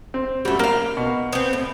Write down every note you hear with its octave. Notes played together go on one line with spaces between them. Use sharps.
C4
F#2 G3 A3 F#4
A#3 A#4 F5
B2
B3 C4
A2